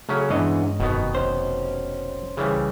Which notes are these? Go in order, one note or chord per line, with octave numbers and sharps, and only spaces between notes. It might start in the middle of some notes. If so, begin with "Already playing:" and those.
C#3 F#3 A3 C#4
E2 G2 E3 G#3 C#4 D4 D#5
F1 B2 D#3 B3
C2 C#4 C5
C#3 E3 G3